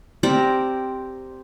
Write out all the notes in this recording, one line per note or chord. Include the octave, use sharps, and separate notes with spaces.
C4 G4 A#4 D5